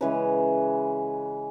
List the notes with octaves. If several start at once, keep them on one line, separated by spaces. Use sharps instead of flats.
C#3 E3 G#3 B4